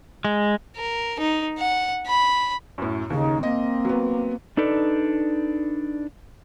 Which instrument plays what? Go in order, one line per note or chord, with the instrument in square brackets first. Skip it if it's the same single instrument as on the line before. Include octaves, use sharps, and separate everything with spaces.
[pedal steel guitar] G#3
[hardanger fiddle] A#4
D#4
F#5
B5
[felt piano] F#2 A2
[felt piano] D#2 [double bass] C#3 [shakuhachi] D#4
[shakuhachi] A#3 [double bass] C4 [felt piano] D#5
[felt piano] F#3 B3
[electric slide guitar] D4 D#4 A4 B4 D5